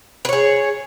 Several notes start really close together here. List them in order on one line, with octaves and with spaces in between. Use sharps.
B4 C#5 G#4